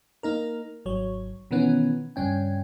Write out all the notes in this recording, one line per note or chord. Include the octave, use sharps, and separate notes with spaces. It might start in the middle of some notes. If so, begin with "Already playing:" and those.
A#3 D#4 A#4
G#1 F#3 C#5
B2 D#3 E3 B3 C#4
G2 C#3 C#4 G5